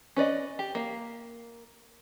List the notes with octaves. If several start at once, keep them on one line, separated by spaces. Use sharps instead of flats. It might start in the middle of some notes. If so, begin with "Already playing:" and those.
C#4 B4 D5 D#5
G4
A#3 F5